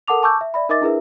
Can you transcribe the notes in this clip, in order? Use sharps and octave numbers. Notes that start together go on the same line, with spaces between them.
A4 A#4 F#5 A5 D6 F7
G#5 A5 C#6 D6 E6 G6
E5
D5 E5 B5
D#4 A#4 D#5 E5 D6 A6
D4 E4 G#4 A#4 B4 E5